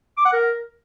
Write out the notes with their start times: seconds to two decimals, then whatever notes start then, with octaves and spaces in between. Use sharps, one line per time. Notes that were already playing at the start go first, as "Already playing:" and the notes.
0.17 D6
0.25 F#5
0.33 A#4